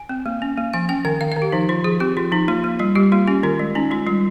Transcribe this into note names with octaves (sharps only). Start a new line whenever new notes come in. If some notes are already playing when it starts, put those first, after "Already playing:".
Already playing: G#5
C4
A#3
C#4
A#3
F3 G#5
C#4 G5
D#3 G5
D#3 F5
D#3 F5
G4
F3 D#4
F3 F4
F3 G#4
C4 G4
F3 F4
F3 D#4
A#3 F4
A#3
G3 F4
G3 G4
A#3 F4
C#4 G4
D#3 F4
G#3
C#4 D#4
G#3 F4
G3 F4